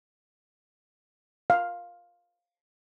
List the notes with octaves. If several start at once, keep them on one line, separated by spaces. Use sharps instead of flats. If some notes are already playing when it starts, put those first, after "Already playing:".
F5